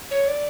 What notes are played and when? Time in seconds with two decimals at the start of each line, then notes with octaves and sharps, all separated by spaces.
0.11 C#5
0.28 D5